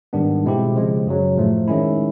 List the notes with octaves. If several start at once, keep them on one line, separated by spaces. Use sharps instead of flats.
G#2 D#3 G3 B3 D4
B2 G#3 C4 E4 G4
C#3 F3 G#3
F#2 C#3 F#3
A2 F3 A3
D#3 G#3 C#4 E4